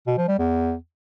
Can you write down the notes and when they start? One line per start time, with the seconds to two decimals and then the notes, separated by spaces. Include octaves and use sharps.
0.07 B2
0.17 F3
0.28 G3
0.38 E2